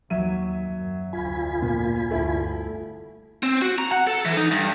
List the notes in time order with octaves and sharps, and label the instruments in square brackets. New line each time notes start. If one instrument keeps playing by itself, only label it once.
[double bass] D#2 [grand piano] F#3 E5 D#7
[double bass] F#2
[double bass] F1 D2 [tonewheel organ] F4 G#5 B5
[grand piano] A#2
[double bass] G1 D2 [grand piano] A3 E4
[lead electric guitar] C4
F#4
A#5
F#5
A4
E3
D#4
G2